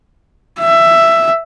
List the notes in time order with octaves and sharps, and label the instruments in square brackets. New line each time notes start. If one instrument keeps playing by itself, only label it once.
[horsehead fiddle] E5